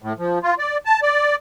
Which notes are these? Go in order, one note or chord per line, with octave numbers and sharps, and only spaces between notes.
A2
F3
F4
D5
A5
D5